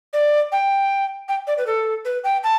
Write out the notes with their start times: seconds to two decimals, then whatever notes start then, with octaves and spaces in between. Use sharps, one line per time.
0.13 D5
0.52 G5
1.28 G5
1.47 D5
1.57 B4
1.66 A4
2.05 B4
2.24 G5
2.43 A5